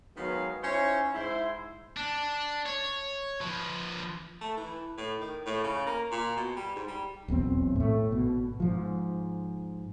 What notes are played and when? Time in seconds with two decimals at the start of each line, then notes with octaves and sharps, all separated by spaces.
0.17 D#3 F#3 G#3 B3 B4 F5
0.63 C#4 D#4 E4 C5 C#5
1.14 G#2 E4 C5
1.97 D4
2.66 C#5
3.41 F3 B4
4.41 A3
4.57 E3
4.98 A2
5.21 D#3
5.46 A2
5.64 C#3
5.86 A#3
6.11 A#2
6.37 B2
6.57 G3
6.76 G#2
6.88 G3
7.28 D#1 B1 E2 C4
7.76 A2 A3
8.11 G#1 B2
8.60 G#2 F3